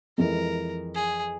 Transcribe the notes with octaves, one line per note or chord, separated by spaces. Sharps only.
F2 E3 G#3 A#4
G#4